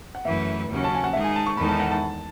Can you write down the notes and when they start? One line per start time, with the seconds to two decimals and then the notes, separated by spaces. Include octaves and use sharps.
0.15 F#5
0.25 F#2 E3 A3 E4 B4 E5
0.69 D#2 C#3 F#3 C#4 F#4
0.84 A5
0.95 G#5
1.04 F#5
1.13 D#3 G#3 D#4 G#4 E5
1.24 G#5
1.36 A5
1.46 C#6
1.57 E2 D#3 G#3 D#4 A4 B5
1.69 A5
1.80 F#5
1.91 A5